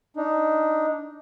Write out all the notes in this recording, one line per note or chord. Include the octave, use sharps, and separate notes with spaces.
D4 D#4